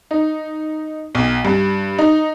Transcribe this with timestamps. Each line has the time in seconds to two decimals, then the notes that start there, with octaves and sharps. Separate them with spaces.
0.11 D#4
1.15 B1
1.45 G2
1.98 D#4